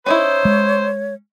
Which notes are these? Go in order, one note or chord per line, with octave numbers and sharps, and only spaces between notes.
C#4 D#4 E4 C5 C#5
G#3